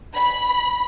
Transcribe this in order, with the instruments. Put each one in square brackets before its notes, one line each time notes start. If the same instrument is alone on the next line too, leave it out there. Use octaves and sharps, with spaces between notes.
[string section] B5